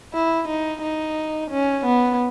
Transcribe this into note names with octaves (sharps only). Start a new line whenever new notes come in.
E4
D#4
D#4
C#4
B3